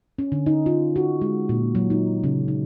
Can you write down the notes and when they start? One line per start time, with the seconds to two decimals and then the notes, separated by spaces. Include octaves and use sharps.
0.19 C#4
0.32 D3
0.46 D#4
0.66 F4
0.96 F#4
1.21 G#3
1.49 A#2
1.75 F#3
1.90 D#4
2.24 C#3
2.48 D#4